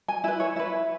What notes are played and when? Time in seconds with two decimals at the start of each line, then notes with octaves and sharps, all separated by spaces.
0.08 G#5
0.24 E4 E5
0.28 B4
0.40 C#5
0.56 E4 B4 E5